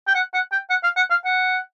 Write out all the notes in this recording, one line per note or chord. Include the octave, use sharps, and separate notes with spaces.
G5
F#5
F#5
G5
F#5
F5
F#5
F5
F#5